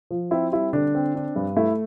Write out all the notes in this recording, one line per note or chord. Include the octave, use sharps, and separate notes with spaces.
F3
C4 E4
G3 E4
D3 D4
C4
D4
G2
A3 E4